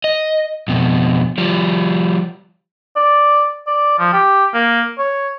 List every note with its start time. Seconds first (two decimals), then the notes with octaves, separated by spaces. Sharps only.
0.04 D#5
0.68 F2 B2
1.38 F3 G3
2.96 D5
3.67 D5
3.99 F3
4.13 G4
4.54 A#3
4.98 C#5